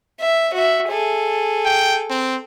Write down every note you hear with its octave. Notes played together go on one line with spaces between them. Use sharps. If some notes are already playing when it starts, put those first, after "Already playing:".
E5
F#4 E5
G#4 A4
G5
C4